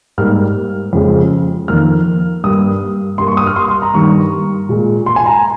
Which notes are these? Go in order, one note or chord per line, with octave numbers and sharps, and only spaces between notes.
G#2 G3 A#3 F6
F2 C#3 F3 G#3
F2 D#3 A#3 F6
G2 G3 A#3 D#6
G2 G3 A#3 C6
C#6
D#6
F6
C6
C6
A#5
G2 D#3 G3 A#3 C#6
A#2 G#3
C6
G#5
A#5